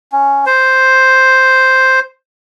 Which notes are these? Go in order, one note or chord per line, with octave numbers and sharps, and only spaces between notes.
C#4
C5